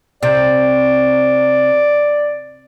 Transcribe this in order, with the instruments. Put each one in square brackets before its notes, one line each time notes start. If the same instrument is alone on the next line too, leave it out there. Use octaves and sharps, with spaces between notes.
[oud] C3 [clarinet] D5